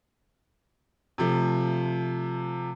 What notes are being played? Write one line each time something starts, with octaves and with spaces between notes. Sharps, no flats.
C3 F3 A3